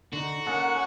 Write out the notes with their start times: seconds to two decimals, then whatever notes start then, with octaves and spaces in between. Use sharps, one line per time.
0.13 D3 D#4 F#4
0.47 A#3 C#4 D#4 A4 F#5